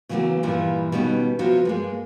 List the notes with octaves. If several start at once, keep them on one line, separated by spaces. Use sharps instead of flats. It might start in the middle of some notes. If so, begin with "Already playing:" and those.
C#3 E3 F#3 G#3 A#3 B3
G2 A#2 E3 F3 G3 E4
B2 D#3 G3 B3 C#4
C3 F3 F#3 B3 F4 F#4
G2 G#3 A#3